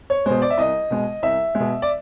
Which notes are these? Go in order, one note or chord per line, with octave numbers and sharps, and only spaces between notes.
C#5
B2 G#3 C5
D5
E5
C2 D#5
B2 G#3
C2 E5
B2 G#3
D5